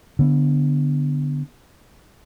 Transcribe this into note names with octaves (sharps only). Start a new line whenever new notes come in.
D3 B3